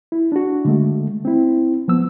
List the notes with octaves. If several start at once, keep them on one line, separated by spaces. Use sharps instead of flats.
E4
D4 F#4
D3 G#3 A3
C4 E4
F3 B3 E6